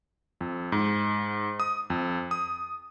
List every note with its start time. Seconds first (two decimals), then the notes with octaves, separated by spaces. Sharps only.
0.41 F2
0.72 G#2
1.60 D#6
1.90 F2
2.31 D#6